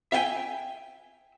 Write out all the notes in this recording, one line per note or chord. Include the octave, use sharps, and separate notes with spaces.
E5 F5 G5 G#5